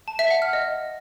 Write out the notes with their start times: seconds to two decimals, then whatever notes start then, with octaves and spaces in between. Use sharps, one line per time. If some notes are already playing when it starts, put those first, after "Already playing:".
0.08 A5
0.19 E5
0.30 F#5
0.42 F6
0.53 D#5